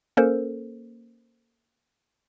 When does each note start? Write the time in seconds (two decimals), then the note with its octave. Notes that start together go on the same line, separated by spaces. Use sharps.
0.17 A#3 C#4 A4 A#4 C5